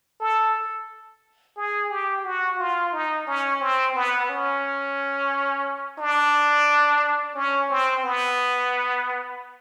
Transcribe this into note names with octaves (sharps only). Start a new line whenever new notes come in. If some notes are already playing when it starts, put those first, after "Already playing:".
A4
G#4
G4
F#4
F4
D#4
C#4
C4
B3
C#4
D4
C#4
C4
B3